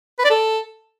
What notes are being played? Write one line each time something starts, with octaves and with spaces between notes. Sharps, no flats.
B4
D5
A4